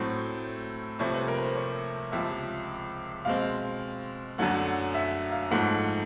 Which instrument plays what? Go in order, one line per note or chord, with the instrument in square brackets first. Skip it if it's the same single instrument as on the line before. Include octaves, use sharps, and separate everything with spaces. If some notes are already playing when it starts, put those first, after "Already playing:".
Already playing: [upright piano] A2 F#3 A3 C4
C2 C3 F3 A3 C4 C#5
B4
A#4
C5
C#5
C#2 C3 F3 E5
B2 G#3 C4 F5
F#2 D3 F#3 A3 F#5
E5
F5
G#2 F3 A3 F#5